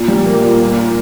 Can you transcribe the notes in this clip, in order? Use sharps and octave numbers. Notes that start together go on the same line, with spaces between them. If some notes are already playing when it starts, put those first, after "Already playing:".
Already playing: A#2
G3
A#3
A#2
A#3
A#2